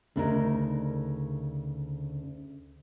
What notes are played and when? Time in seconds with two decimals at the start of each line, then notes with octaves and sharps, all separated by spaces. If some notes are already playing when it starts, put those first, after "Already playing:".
0.16 D2 C#3 D4 D#4 A#4